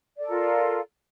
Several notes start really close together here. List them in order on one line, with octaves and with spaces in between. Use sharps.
D5 A4 A#4 F4